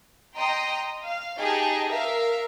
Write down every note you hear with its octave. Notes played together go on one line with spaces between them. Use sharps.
D#5 G5 A#5 C6 D#6
F5
D#4 G4 G#4 D#5 A5
A#4 E5 F5